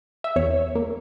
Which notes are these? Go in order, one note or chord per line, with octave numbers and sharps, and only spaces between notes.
E5
E2 C#5
A#3